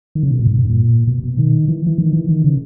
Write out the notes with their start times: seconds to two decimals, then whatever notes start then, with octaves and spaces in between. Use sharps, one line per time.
0.15 D#3
0.23 C#3
0.31 B2
0.39 A#2
0.47 G#2
0.57 G2
0.68 A#2
1.07 B2
1.23 B2
1.38 D#3
1.68 E3
1.87 E3
1.98 D#3
2.13 E3
2.29 D#3
2.44 C#3